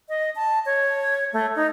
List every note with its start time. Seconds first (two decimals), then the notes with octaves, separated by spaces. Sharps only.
0.09 D#5
0.35 A5
0.66 C#5
1.33 A3
1.56 D#4